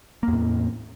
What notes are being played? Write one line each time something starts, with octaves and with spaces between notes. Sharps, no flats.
E2 A2 A#3